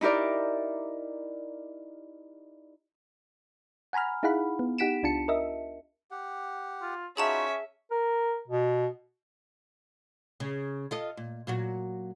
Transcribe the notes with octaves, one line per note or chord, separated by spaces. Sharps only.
D#4 E4 G4 A#4 D5
F#5 G#5 A#5 B5 F6
D#4 E4 G#4 F5 F#5 B5
B3
D#4 G4 F#5 B6 D7 E7
C#2 D4 F4 A5 C#7
A#4 D#5 E5
G4 F#5
F4
C#4 D#4 F4 F#4 G#4 E5 A5 E7
A#4
B2
C#3
F4 A4 D#5
A#2
A#2 F#3 F#4